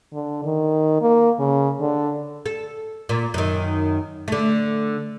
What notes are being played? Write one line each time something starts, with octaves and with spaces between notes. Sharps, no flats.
D3
D#3
A#3
C#3
D3
A4
A#2
F#2 D#3
D3 A3